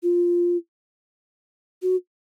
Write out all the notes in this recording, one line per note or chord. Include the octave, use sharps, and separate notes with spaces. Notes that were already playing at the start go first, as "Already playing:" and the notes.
F4
F#4